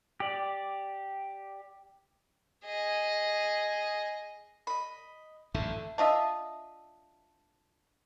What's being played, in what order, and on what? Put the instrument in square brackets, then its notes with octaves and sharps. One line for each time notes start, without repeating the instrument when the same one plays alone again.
[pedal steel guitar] G4 D5
[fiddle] G#4 D#5
[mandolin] D#5 B5
[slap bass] A1 F#2 D3 [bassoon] A3
[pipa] D4 F4 D#5 E5